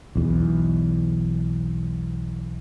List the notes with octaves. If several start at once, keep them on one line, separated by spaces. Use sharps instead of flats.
B1 E2